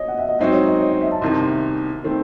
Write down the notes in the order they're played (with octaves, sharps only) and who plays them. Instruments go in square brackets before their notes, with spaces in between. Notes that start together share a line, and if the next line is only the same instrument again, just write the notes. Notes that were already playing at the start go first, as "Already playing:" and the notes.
Already playing: [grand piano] C#5 D#5
F#5
E5
D#5
[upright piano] G#2 F#3 C4 D#4 F#4 [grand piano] E5
[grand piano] C#5
D#5
C#5
D#5
E5
A5
[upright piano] C2 C3 D#3 [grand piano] C6
[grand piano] C6
[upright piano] D#3 A3 C4